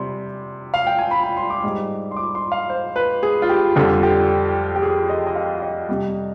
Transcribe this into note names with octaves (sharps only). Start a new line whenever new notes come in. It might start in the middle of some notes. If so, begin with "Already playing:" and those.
Already playing: C3 G3 C6
F5
G5
G#5
B5
B5
C6
D6
G#2 G3
C6
D6
C6
F5
C5
B4
G#4
F4
G4
F2 D3 G3 F4
G4
G4
G#4
D#5
D#5
F5
D#5
C3 G3